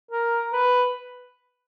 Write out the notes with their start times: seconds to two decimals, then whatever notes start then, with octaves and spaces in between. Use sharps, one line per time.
0.11 A#4
0.53 B4